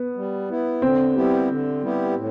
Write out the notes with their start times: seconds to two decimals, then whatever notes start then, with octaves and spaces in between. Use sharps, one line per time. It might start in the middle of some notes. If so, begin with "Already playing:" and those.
Already playing: B3
0.16 G3
0.49 B3 E4
0.82 D3 C4
1.15 G3 B3 E4 G4
1.49 D3
1.81 G3 B3 E4 G4
2.15 A2